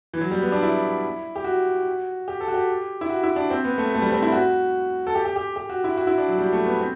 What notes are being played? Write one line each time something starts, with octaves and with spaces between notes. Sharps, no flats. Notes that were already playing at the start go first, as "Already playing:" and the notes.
E3
F#3
G3
B3
D4
E4
G4
F#4
G4
A4
F#4
G4
E4
F#4
E4
D4
C4
B3
A3
A3
G3
C4
E4
F#4
A4
G4
G4
G4
G4
F#4
E4
F#4
E4
D4
F#3
G3
A3
B3
C4